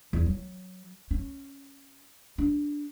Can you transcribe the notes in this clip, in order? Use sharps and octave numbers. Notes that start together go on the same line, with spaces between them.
E2
F#3
C#4
D4